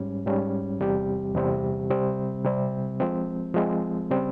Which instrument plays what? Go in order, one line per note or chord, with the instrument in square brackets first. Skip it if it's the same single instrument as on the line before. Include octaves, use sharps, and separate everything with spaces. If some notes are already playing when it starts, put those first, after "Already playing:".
Already playing: [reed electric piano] G#2 G3 C#4
G#2 G3 C#4
E2 C3 G3 C4 G4
E2 C3 G3 C4 G4
C3 G3 C4
C3 G3 C4
F3 G#3 C4
F3 G#3 C4
C#3 G3 C4